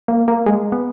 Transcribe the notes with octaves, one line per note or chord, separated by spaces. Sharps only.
A#3
A#3
G#3
B3